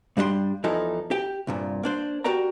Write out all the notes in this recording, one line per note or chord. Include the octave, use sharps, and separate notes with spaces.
G2 G3 D4 D#5 C6
E2 E3 F3 D#4 A4
G4 G5
C2 G2 A#2
A#3 D4 C5
F#4 G4 A#4 D5 G5 A#5